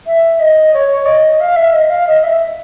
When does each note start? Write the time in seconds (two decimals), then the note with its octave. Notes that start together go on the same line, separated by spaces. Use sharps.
0.06 E5
0.40 D#5
0.74 C#5
1.06 D#5
1.40 F5
1.56 E5
1.73 D#5
1.90 F5
2.07 D#5
2.23 E5